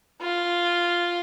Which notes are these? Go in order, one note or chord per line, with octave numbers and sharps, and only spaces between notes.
F4